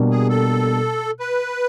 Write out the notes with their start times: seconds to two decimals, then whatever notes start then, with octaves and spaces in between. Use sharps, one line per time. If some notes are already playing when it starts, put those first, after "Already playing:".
Already playing: B2 G3 A#3 D4
0.11 G#4
0.29 A4
1.20 B4